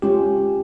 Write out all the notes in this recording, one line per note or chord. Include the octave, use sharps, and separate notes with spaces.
G#3 C#4 F4 G4